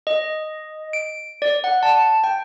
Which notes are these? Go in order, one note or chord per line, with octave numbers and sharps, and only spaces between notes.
D#5
D7
D5
F#5
A5
G5